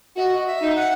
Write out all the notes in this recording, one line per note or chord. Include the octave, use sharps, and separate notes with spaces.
F#4 D#5 E5
E5
D#4
F#5